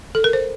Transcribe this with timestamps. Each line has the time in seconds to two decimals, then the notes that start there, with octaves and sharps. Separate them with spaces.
0.15 A4
0.24 A#4
0.33 C5